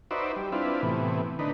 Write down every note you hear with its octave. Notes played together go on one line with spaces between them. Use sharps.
D#4 F#4 B4 C5 D5 E5
G3
C4 D4 E4 F4 B4
A2 C3 E3 B3
D3 D#4 B4